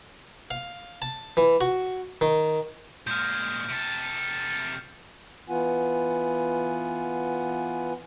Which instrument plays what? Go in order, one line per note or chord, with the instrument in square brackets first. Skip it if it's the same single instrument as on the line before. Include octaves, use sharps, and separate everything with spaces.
[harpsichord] F5
A5
E3
F#4
D#3
[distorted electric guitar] A#2 G#3 [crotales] F6 G6
[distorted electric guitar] C3 A4
[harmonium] E3 B3 F4 F#5 G#5